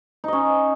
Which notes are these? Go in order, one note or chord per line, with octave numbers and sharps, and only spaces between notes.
C#4 D#4 D#5